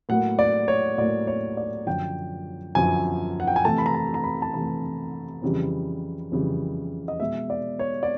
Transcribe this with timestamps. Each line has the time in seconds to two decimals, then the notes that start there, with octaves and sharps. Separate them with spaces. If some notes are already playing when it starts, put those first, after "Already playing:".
0.09 A2 F#3 A#3 F#5
0.39 D5
0.68 C#5
0.98 A2 F#3 A#3 D5
1.27 C#5
1.57 D5
1.86 F#2 D3 F3 G5
2.75 F#2 D3 F3 G#5
3.40 F#5
3.47 G5
3.56 G#5
3.65 C3 E3 A3 A5
3.78 B5
3.86 A#5
3.94 A5
4.14 A#5
4.24 B5
4.42 A5
4.53 C3 E3 A3 A#5
5.42 F2 C#3 E3 G3
6.32 F2 C#3 E3 G3
7.08 D#5
7.20 B2 G#3 E5
7.50 D5
7.79 C#5
8.03 D5